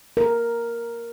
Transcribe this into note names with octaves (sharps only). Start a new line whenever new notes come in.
A#4